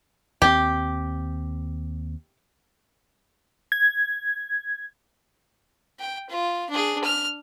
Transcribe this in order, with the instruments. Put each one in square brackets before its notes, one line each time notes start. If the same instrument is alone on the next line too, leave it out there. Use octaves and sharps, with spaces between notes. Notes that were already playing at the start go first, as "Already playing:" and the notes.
[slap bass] D#2 C4 [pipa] G4
[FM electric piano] G#6
[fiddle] G5
F4
D4 G#4
F6